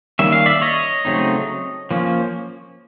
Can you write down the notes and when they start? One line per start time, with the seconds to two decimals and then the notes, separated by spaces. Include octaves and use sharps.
0.19 D#3 G3 A#3 C#4 E5
0.32 F5
0.46 D5 E5
0.62 C#5 D#5
1.05 C#3 F#3 A3 C4 D#4
1.91 F3 A#3 C#4